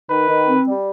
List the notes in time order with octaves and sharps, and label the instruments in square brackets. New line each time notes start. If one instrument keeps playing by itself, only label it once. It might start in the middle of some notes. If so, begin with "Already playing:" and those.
[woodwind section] D#3 [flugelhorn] B4
[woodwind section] D#3
C4
G3